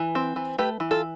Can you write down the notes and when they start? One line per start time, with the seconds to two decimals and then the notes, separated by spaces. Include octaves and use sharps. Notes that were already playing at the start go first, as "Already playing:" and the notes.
Already playing: E3
0.15 C4
0.36 E3
0.58 A3 G4 B4
0.80 E3
0.91 F4 A4